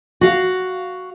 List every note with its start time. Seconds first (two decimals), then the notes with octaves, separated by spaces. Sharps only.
0.21 F#4 F5